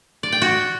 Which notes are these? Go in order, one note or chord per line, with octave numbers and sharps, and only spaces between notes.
D5
G5
F#4